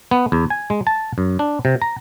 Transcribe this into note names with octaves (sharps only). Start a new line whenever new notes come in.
B3
E2
G#5
G#3
A5
F#2
D4
C3
A#5